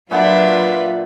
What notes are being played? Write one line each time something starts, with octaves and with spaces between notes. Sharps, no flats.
A#2 F#3 D4 F4 B4 E5 F#5 B5